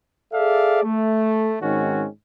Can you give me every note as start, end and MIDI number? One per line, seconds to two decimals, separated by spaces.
0.33 0.83 68
0.33 0.83 69
0.33 0.83 74
0.33 0.83 76
0.33 0.83 77
0.83 1.55 57
1.62 2.06 44
1.62 2.06 51
1.62 2.06 60
1.62 2.06 61
1.62 2.06 66